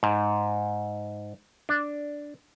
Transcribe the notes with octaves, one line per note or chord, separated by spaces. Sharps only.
G#2
D4